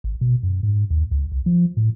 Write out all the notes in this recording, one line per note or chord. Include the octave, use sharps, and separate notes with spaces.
G#1
B2
F#2
G#2
D#2
C#2
C2
F3
A2